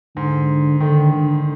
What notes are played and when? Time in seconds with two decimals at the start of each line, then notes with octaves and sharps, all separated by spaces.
0.16 G#2 D3
0.80 D3 D#3
1.14 D3